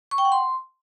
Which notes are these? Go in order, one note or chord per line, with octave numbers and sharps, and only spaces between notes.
C#6
G5
F#5
C6